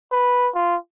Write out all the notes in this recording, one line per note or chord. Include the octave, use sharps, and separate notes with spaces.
B4
F4